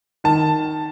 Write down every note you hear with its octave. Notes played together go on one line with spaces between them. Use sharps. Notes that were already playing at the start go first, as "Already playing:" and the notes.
D#3 A5